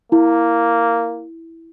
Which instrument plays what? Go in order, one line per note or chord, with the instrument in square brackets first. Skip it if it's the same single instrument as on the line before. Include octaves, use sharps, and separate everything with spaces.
[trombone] A#3 [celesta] E4